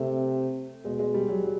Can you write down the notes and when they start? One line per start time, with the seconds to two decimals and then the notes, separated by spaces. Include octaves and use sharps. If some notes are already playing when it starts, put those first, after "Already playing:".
Already playing: C3 A3
0.85 B2 G#3
0.99 G#3
1.14 G3
1.28 F#3
1.44 F#3